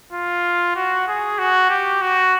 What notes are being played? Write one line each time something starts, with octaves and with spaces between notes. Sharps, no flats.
F4
F#4
G#4
F#4
G4
F#4